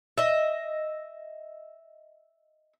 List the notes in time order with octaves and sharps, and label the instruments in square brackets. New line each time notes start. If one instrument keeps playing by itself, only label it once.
[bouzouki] D#5 E5